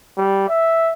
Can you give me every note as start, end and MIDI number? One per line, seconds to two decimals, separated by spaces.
0.18 0.46 55
0.49 0.93 76